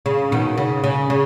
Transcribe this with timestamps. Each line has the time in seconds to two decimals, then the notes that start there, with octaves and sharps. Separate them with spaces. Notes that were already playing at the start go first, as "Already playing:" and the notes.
0.06 C#3
0.32 B2 D#3
0.57 C#3
0.84 C#3
1.10 C#3